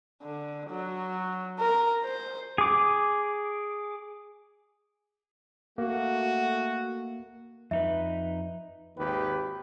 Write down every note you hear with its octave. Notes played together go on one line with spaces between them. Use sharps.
D3
F#3
A#4
C5
G#4 D6
A3 A#3 F#4
F2 D#4 B4 E5
G#1 D#2 G4 B4